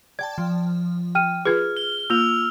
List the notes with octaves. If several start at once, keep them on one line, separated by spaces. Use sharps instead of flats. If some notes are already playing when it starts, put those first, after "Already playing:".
D5 G5 A5 G#6
F3
G5 F6 D#7
F4 G#4 B4 F6 G#6
F6 G7
A#3 F4 E6 F7